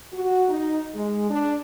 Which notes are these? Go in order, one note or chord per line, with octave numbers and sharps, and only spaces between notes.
F#4
D#4
G#3
D4